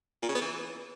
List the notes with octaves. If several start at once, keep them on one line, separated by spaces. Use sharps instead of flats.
A#2
C#3
B3
E3